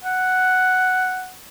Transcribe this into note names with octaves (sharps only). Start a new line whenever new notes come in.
F#5